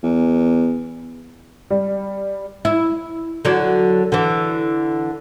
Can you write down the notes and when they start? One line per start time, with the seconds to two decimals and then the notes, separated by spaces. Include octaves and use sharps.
0.03 E2
1.70 G3
2.65 E4
3.45 D3 F#3 D5
4.12 D3 E3